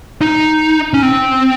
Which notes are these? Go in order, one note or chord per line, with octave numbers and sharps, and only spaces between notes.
D#4
C#4
C4